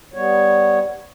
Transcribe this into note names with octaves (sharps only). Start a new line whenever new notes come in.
G3 B3 C#5